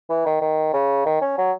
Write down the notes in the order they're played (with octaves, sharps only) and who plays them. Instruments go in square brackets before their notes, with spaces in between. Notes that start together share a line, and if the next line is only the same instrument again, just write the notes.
[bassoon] E3
D#3
D#3
C#3
D#3
C#4
F#3